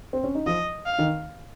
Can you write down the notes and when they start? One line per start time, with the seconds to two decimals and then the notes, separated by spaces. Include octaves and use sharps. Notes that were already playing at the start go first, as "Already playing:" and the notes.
0.13 C4
0.24 C#4
0.35 D#4
0.46 F3 F4 D#5
0.86 F5
0.98 D#3 D#4